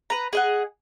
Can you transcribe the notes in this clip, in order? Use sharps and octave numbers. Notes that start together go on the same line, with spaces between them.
B4 A#5
G#4 D#5 F#5